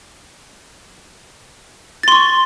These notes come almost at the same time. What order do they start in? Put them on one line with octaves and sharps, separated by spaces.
A6 C6 C#6